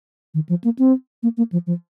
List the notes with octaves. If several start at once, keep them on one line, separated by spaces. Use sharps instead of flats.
D#3
F3
A#3
C4
A#3
A#3
F3
F3